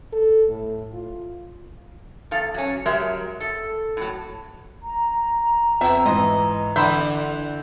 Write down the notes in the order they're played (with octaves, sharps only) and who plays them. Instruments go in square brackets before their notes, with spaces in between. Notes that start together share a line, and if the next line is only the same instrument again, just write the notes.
[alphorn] A4
A2
F4
[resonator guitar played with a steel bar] E2 A4 F5
F#3 C#4
F#3 G#3 G4 A#4 E5
A4
A2 F#3
[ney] A#5
[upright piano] F2 [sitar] B3 E5
[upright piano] G#2 E3 C6 [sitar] D#5
[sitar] D3 E3 E5 [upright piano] B5 C6 G6